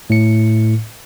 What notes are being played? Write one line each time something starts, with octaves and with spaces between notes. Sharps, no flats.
A2 C#7